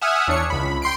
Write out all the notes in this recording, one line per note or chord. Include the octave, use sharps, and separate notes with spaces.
E5 F#5 G#5 D#6 F6
E2 D4 C#5 C#7
C#2 B5
G5 C6 C7 D7